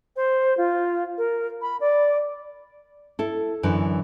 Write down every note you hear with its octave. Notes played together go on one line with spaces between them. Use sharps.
C5
F4
A#4
B5
D5
E4 A4
F#2 D3 E3